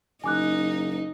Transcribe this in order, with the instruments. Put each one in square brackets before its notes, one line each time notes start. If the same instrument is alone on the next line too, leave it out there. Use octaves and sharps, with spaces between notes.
[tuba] F#1 [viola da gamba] D#4 [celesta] G#5 D6 F#6